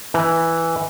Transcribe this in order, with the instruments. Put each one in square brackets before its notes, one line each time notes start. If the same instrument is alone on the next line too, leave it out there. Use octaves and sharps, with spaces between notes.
[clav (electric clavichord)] E3